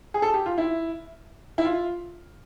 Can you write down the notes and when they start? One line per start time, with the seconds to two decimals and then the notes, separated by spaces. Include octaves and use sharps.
0.14 G#4
0.22 A4
0.34 G4
0.46 F4
0.58 E4
1.58 E4
1.65 F4